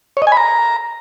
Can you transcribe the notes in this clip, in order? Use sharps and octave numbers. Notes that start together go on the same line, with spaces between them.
C#5
D#5
G#5
B5
A#5